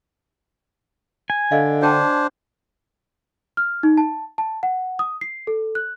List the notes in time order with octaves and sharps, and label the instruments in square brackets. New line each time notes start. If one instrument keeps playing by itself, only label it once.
[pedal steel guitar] G#5
[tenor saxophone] D3 [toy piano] D#5 F5
[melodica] D4 C5 [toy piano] F#4 G5 A5
[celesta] F6
D#4
A5
A5
F#5
D#6
C7
A4
F#6